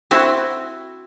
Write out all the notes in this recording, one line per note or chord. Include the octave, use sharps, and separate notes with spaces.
C4 E4 F#4